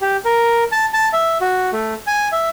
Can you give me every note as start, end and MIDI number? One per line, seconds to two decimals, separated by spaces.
0.02 0.17 67
0.25 0.64 70
0.72 0.86 81
0.94 1.08 81
1.13 1.38 76
1.41 1.71 66
1.73 1.94 57
2.07 2.29 80
2.32 2.49 76